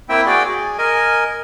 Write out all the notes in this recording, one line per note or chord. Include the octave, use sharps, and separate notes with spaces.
A#3 C4 E4 E5 G5
F#4 G#4 D5 G5
G#4
A#4 D#5 G#5